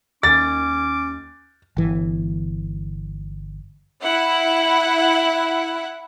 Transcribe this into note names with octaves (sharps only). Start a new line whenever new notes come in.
D#2 C#4 D6 A6
G1 E3
E4 F#5